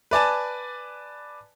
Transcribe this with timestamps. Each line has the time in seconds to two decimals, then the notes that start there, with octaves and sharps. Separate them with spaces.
0.11 B4 D5 G#5 A5